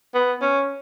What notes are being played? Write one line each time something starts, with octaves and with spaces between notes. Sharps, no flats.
B3
C#4